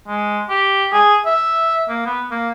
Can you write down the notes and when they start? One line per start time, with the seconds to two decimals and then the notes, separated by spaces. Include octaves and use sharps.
0.07 G#3
0.49 G4
0.92 G#4
1.26 E5
1.89 A#3
2.06 B3
2.31 A#3